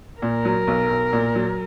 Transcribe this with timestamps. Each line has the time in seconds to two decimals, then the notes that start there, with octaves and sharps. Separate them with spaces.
0.22 A#2 A#4
0.45 F#3
0.67 B1
0.90 B1
1.13 A#2
1.35 F#3